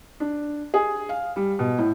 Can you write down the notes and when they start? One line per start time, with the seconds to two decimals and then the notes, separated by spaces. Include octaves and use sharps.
0.20 D4
0.74 G#4
1.09 F5
1.36 G3
1.59 B2
1.78 A2